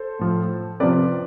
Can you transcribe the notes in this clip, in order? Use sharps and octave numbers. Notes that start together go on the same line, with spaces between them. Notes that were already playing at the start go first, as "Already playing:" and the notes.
Already playing: A4 C5
A2 F3
C3 F3 B4 D5